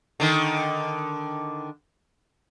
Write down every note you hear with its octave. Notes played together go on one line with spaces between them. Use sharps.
D3 D#3